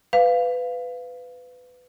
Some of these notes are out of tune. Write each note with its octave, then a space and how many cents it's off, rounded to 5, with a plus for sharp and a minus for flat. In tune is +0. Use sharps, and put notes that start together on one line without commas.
B4 +20 F5 +0